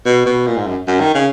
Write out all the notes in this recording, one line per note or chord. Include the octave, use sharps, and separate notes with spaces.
B2
B2
A#2
G#2
F#2
F#2
D#3
C#3